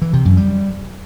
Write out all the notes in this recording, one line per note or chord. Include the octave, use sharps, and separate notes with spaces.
E3
C3
F#2
G3